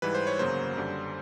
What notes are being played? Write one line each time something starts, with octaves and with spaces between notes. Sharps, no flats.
G#2 E3 G3 B4
C5
C#5
G1 F#2 C#3 F#3 A#3 C5
F#2 D3 G3